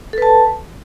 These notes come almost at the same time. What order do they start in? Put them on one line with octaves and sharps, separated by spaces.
A4 B4 A5